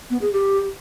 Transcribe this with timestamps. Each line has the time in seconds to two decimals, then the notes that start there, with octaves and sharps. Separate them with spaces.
0.10 B3
0.21 G#4
0.33 G4